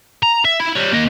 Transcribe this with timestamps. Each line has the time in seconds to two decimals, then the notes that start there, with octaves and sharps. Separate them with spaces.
0.23 A#5
0.45 E5
0.60 E4 B5
0.75 G3 C#5
0.93 A#3 D#5